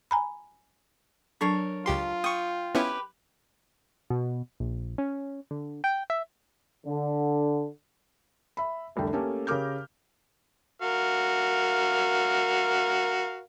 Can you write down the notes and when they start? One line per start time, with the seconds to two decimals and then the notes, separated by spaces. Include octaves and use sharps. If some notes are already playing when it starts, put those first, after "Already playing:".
0.11 G#5 A#5 B5
1.41 F#3 D4 A4 A#4 C#5
1.86 C#2 F4 G4 C6
2.24 G5 C#6 D#6
2.75 B3 C#4 E4 G4 B4 G5
4.10 B2
4.60 A#1
4.98 C#4
5.51 D3
5.84 G5
6.10 E5
6.87 D3
8.57 E5 B5
8.96 F1 C2 D3 G5
9.13 A3 A#3 C#4 G4 A4
9.47 C#3 G4 A#4 D6 F6 G6
10.82 F#4 A#4 F5